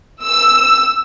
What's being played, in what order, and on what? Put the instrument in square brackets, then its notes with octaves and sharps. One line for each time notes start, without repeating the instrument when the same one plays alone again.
[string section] E6